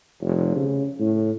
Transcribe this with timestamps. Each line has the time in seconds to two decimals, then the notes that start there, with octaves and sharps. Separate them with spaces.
0.21 F1
0.56 C#3
0.99 A2